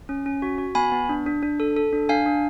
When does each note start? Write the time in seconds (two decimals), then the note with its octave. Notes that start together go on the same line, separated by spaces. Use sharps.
0.09 C#4
0.26 C#4
0.42 F#4
0.58 F#4
0.75 B3 G#5 B5
0.92 B3
1.09 D4
1.26 D4
1.43 D4
1.60 A4
1.77 A4
1.93 D4
2.09 D4 F5 G#5
2.26 D4